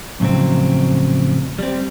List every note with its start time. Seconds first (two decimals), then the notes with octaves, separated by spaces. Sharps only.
0.20 F2 A2 C#3 F#3 C4
1.59 G3 C4